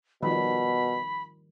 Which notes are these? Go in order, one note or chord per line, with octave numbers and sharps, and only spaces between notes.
B2 D#3 F3 G3 B5